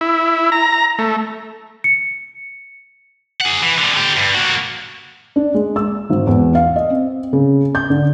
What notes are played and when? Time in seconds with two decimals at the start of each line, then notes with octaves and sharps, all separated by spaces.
0.01 E4
0.52 A#5
0.99 A3
1.84 C#7
3.41 G#4 F#5
3.62 E3
3.78 A2 D3
3.94 D3 G4
4.16 G2
4.34 A#3 F#4
5.36 D4
5.54 G#3
5.76 E6
6.10 G#1
6.27 E2
6.55 F5
6.76 D#5
6.90 C4
7.33 C#3
7.75 G6
7.90 D3